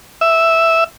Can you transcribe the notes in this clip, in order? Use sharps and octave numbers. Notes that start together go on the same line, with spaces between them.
E5